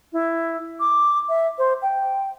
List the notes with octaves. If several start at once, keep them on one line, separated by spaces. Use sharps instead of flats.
E4
D6
E5
C5
G5